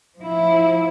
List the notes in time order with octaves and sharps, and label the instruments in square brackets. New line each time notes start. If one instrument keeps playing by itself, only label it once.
[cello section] F3 E4